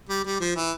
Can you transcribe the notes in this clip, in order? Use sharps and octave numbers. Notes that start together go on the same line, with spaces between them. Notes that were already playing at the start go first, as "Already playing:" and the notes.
G3
G3
F3
E3